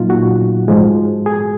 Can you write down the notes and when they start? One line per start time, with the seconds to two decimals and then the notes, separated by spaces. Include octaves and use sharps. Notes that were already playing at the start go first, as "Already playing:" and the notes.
Already playing: A#2 F#3 A#3 D#4 F4
0.10 F#4
0.68 G#2 F3 G#3
1.26 G#4